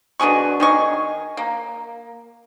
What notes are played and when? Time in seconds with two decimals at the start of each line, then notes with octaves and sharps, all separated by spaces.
0.20 B2 D3 G#4 C#6
0.60 D#3 G#4 C#6
1.37 A#3